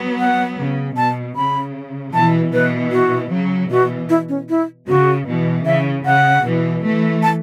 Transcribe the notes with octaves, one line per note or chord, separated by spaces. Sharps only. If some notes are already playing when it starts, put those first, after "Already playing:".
Already playing: F#3 B3
F#5
C#3
B2 A5
C#3 B5
B2 E3 A5
B2 E3 B4
F#4
C#3 F#3
B2 E3 F#4
E4
C#4
E4
C#3 F#4
B2 E3
C#3 E5
C#3 F#5
B2 E3
E3 A3
A5